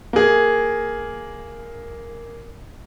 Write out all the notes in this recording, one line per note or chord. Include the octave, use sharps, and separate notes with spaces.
A#3 G#4